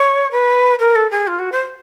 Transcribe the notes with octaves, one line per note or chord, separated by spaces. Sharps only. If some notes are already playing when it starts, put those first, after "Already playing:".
Already playing: C#5
B4
A#4
A4
G#4
F4
F#4
C5